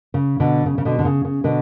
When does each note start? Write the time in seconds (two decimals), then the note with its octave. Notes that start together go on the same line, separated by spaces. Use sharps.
0.14 C#3
0.40 B2 D3
0.66 C#3
0.78 C#3
0.85 B2 D3
0.99 D3
1.05 C#3
1.25 C#3
1.44 B2 D3